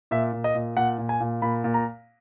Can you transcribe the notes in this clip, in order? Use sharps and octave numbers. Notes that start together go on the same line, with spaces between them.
A#2 E5
A#2
D#5
A#2
A#2 F#5
A#2
G#5
A#2
A#2 B5
A#2
A#5